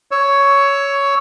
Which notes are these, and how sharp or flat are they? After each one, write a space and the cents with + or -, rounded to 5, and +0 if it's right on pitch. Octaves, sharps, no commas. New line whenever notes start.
C#5 +10 E6 +0